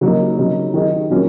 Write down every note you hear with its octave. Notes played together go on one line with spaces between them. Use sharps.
C#3 F#3 A#3 D#4
C#3 F#3 D#4
D#3 F#3 D#4 G#4
A#2 F#3 A#3 C#4 F#4